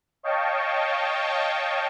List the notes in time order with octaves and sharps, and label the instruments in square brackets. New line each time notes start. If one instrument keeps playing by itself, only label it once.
[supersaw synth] C#5 D#5 F5 G5 A5 C#6